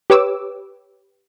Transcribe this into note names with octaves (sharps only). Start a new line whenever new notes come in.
G4 B4 C#5 D6 E6